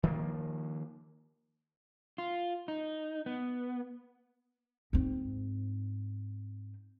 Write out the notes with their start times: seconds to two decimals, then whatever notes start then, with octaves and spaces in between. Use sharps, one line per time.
0.03 D#3 F3 A#3
2.18 F4
2.68 D#4
3.26 B3
4.93 G#2 C4